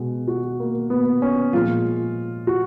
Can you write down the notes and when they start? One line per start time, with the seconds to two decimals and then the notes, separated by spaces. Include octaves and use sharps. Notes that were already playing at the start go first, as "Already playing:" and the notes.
Already playing: B2 G#3
0.28 F#4
0.60 A#3
0.90 B3
1.22 C#4
1.53 A#2 F3 G#3 F4
2.47 F#4